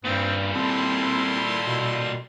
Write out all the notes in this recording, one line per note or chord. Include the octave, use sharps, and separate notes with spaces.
G2 A#2 G3 C4
C4 E4 A4 C6
B2